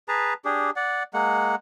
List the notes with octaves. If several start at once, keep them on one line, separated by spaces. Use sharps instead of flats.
G#4 B4 A5 A#5
D4 G4 G#4
D5 F#5
G#3 A#3 F#5